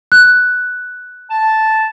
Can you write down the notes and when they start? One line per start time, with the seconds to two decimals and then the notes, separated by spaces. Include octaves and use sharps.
0.12 F#6
1.31 A5